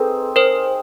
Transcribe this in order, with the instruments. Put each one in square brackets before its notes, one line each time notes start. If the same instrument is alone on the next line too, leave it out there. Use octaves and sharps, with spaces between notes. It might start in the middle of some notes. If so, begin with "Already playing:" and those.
Already playing: [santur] C4 D#4 G#4 [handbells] A4 B4
[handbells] A#4 C5